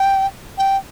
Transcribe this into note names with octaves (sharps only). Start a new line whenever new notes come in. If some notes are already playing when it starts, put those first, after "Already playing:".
Already playing: G5
G5